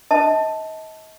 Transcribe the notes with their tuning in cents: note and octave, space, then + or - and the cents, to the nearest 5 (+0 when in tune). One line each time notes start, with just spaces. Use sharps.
D#5 +35 A5 +0